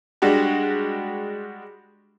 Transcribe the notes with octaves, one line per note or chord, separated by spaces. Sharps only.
G3 G#3 D4 F#4 G4